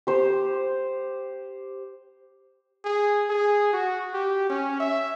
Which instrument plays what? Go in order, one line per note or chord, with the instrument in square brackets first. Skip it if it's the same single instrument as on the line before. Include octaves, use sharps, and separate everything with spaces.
[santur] G4 C5
[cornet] G#4
G#4
F#4
G4
C#4
E5